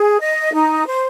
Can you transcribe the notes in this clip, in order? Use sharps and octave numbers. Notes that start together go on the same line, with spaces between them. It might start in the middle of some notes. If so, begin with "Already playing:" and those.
Already playing: G#4
D#5
D#4
C5